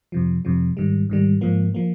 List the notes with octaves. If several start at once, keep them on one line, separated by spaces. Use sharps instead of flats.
F2 C3 F3
F2 C3 F3
G#2 D#3 G3
G#2 D#3 G3
G#2 F3 A#3
F3 A#3